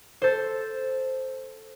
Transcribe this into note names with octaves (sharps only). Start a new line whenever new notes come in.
A4 C5